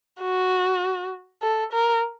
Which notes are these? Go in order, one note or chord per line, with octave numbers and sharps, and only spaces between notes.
F#4
A4
A#4